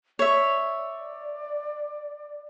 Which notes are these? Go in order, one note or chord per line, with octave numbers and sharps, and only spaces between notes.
C#5 D5 E5